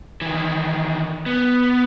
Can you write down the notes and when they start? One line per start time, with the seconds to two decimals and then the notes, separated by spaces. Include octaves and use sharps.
0.22 D#3 E3
1.26 B3